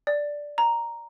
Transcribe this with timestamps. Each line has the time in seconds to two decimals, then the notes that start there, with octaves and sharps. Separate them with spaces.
0.07 D5
0.58 A#5